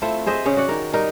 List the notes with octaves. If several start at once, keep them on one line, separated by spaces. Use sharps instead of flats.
A3 C4 E4 F4
G#4 C5 D#5 E5
C#3 C#4 G#4 C#5
F#4 D5 F#5
D#3 A#4
G3 D#4 A#4 D#5